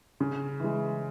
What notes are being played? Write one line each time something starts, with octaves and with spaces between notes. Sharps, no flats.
C#3
E3 G#3